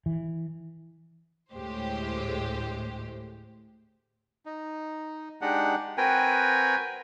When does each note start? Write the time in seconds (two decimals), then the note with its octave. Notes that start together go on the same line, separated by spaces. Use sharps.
0.06 E3
1.53 D2 A2 G#3 G4 C5
4.46 D#4
5.41 G#3 D4 D#4 G4 F#5
5.97 C4 F#4 A#4 B4 G5 G#5